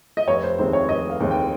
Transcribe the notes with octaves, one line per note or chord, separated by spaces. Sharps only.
D#5
F1 C#5
C5
D#2 D#3 G#3 C4 C5
C#5
F1 D#5
F5
D#2 D#3 G#3 C4
G5